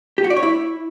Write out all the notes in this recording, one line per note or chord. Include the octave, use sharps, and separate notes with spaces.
G4
F#4
D5
C#5
E4